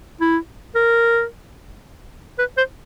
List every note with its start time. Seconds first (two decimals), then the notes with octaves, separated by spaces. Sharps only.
0.21 E4
0.75 A#4
2.38 B4
2.57 C5